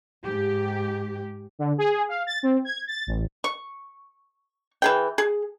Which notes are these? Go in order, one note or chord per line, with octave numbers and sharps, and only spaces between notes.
G#2 G4
D3
G#4
F5
A6
C4
G#6
A6
A1
C#6
E3 G#4 G5
G#4